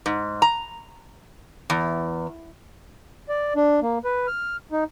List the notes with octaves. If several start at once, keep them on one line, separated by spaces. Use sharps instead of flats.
G#2
A#5
E2
D5
D4
A#3
B4
F6
D#4